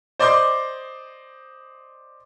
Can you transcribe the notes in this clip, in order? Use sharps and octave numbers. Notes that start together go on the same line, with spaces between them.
C5 D5 D#5 C6 D6 G6